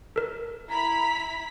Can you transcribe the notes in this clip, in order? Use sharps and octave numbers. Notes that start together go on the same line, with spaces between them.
A4 A#4
E4 A#5 B5 B6